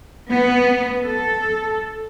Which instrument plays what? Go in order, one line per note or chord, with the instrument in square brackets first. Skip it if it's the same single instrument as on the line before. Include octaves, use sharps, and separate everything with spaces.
[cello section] B3
A4